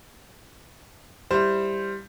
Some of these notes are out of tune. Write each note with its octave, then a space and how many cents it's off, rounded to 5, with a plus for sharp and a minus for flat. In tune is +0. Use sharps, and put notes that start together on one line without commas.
G3 +10 E4 +0 C5 +0